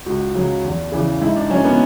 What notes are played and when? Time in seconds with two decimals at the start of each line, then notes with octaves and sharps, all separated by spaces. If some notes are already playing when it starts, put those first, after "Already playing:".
0.06 C#2 F#4
0.35 C#3 F#3
0.64 E2
0.92 C#3 E3
1.21 G#2 E4
1.36 D4
1.50 F#3 C#4
1.65 B3